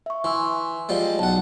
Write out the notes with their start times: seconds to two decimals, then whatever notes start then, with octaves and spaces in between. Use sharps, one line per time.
0.06 E5 C#6
0.24 E3 G#5 C6 E6
0.89 F3 G3 G#3
1.19 B1 F#5 A5